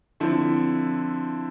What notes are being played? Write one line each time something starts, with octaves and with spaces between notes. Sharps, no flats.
D3 F3 C4 E4